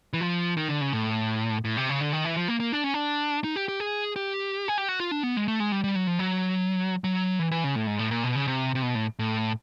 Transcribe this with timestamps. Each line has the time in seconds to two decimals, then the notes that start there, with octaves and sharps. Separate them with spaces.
0.13 E3
0.21 F3
0.57 D#3
0.69 D3
0.81 C#3
0.93 A2
1.65 A2
1.77 C3
1.89 C#3
2.01 D3
2.13 D#3
2.25 E3
2.36 F3
2.48 A#3
2.60 A#3
2.72 D4
2.84 C#4
2.94 D4
3.44 D#4
3.56 G4
3.68 G4
3.80 G#4
4.16 G4
4.68 G#4
4.78 G4
4.89 F#4
5.00 F4
5.11 D4
5.23 B3
5.37 G#3
5.48 A3
5.60 G#3
5.72 G3
5.84 G3
5.95 F#3
6.07 F3
6.19 F#3
7.04 F#3
7.39 E3
7.51 E3
7.64 C#3
7.75 A2
7.87 G#2
7.99 A2
8.11 A#2
8.24 B2
8.36 C#3
8.47 C3
8.75 C3
8.83 B2
8.95 A2
9.19 A2